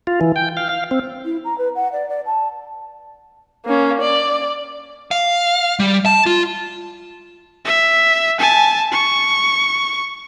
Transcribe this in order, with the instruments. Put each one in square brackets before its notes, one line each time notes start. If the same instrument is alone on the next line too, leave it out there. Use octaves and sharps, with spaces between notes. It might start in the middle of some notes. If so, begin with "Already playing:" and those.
[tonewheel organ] F4
E3
G5
F5
F5
C4
[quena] E4
A#5
B4
F#5
D5
D5
A5
[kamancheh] A#3 C#4
D5
[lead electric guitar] F5
G3
A5
F4
[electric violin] E5
G#5 A5
C#6